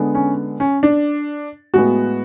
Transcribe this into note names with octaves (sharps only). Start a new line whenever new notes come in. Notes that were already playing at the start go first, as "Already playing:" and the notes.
Already playing: D3 G#3 B3
C#4
C#4
D4
A2 G#3 B3 F#4